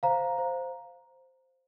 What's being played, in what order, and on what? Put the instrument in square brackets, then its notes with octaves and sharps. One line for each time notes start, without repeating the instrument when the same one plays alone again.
[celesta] C5 F5 A#5
C5